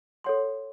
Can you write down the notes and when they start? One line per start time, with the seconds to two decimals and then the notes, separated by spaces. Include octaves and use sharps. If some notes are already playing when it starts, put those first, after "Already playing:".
0.24 A4 C#5 F#5 C6